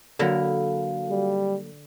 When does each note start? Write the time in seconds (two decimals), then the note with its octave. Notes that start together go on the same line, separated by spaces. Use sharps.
0.19 D3 F#3 A#3 E4 F#4 A4 A#4 F5
1.11 G3